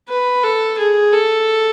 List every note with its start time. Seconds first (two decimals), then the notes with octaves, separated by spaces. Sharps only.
0.09 B4
0.43 A4
0.78 G#4
1.12 A4